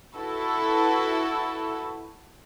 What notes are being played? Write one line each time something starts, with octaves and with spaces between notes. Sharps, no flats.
E4 F#4 A4 B4